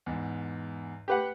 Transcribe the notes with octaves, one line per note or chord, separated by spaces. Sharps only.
E2 G#2
G4 B4 F#5